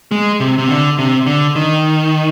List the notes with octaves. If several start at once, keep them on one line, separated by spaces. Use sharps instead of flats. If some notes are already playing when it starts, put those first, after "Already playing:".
G#3
C3
C3
D3
C3
D3
D#3